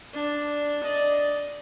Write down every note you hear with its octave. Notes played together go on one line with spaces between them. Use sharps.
D4
D5 D#5